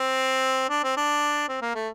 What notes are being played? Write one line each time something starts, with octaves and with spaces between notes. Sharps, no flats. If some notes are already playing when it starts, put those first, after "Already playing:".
Already playing: C4
D4
C4
D4
C4
A#3
A3